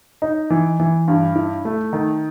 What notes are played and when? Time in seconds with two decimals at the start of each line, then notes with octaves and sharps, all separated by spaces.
0.22 D#4
0.50 E3
0.80 E3
1.08 G2
1.35 E4
1.65 A3
1.93 D#3